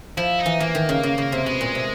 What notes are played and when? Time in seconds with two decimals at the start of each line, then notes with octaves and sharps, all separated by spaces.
0.17 F3 E4
0.39 D#4
0.46 E3
0.60 E3 A#3
0.75 D#3
0.89 C#3
1.03 C#3
1.18 C#3
1.32 C3
1.46 B2 G#3
1.61 A#2
1.75 C3